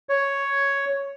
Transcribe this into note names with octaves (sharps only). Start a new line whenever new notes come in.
C#5